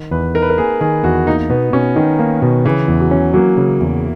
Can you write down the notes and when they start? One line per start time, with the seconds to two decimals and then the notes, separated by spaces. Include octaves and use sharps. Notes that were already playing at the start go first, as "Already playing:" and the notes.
Already playing: D#3
0.11 E2 B4
0.35 D#4 A#4
0.42 B4
0.50 A#4
0.57 A#3 G#4
0.81 D#3 G#4
1.04 E2 F#4
1.27 A#3 D#4
1.50 B2 B3
1.73 B2 C#4
1.96 D#3 D#4
2.19 A#3
2.42 B2
2.65 C#3 E3
2.88 E2
3.00 F#3
3.11 C#4
3.34 F#3 A#3
3.57 C#3
3.81 E2